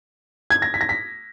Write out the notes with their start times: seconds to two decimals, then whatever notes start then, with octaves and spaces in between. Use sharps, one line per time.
0.50 G#6
0.62 A#6
0.74 B6
0.81 A#6
0.89 B6